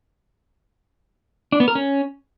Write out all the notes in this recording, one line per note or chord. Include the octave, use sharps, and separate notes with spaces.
D4
B3
A#4
C#4